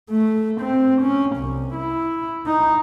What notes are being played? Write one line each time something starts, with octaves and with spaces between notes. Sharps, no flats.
A3
C4
C#4
C2
E4
D#4